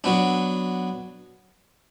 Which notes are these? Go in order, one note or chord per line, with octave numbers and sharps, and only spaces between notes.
F#3 B3 D4